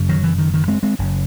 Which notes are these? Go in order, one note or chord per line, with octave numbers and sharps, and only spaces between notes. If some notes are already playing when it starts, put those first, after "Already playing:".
Already playing: F#1 F#2 C#3
D#3 F#3
E3
D#3
D#3
G#3 C4
G#3 C4
F#1 F#2 C#3